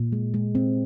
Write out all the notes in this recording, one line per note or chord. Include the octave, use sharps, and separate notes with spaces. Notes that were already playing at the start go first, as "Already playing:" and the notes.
Already playing: A#2
G#3
G#3
C4